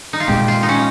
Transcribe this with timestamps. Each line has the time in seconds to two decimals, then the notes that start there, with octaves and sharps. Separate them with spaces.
0.13 D#4
0.20 F4
0.27 A#2 G#3 C4 G4
0.48 F4
0.63 D#4
0.69 C#4